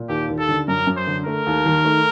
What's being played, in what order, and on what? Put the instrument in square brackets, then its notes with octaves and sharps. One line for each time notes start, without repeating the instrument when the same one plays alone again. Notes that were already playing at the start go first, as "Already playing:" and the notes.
Already playing: [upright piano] A#2
[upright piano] D#2 [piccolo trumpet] G4
[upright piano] D#2
[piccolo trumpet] A4
[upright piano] D3
[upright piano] F#2 [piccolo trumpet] A#4
[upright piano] F#2
[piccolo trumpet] C5
[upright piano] D3
[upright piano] A3 [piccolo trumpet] A#4
[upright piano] D#2
D#3
A3